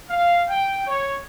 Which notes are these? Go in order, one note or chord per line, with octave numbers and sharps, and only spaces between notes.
F5
G5
C#5